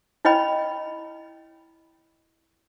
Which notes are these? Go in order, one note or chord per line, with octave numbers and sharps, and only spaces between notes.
E4 C#5 D#5 G5 B5